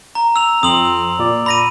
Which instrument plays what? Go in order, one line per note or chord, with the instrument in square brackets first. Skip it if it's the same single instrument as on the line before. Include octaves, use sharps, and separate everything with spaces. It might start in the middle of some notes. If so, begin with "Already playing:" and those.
[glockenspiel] A#5
E6 F7
[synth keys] F2 [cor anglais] C4 [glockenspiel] D#6 F#7
[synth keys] A#2 [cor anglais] D5
[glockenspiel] B5 A#6 D#7